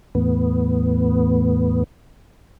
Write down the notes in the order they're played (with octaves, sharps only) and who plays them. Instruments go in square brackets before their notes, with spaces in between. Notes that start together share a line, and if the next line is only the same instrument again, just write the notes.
[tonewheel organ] E2 A2 B3